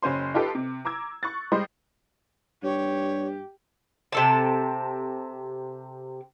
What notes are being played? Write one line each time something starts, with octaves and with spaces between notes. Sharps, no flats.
F#1 C#4 C5 C6
D#4 F4 G4 A4 B4
C3
A#5 D6 E6 G#6
C#6 F#6 A6
G3 G#3 C5 D#5
G2 G4 C#5
C3 A4 A5